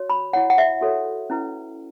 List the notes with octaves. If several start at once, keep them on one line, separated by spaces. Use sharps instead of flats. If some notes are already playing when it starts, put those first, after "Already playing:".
Already playing: F#4 C#5
B5
E4 C#5 F#5
F#5
E5
F#4 A4 C#5
C#4 E4 B4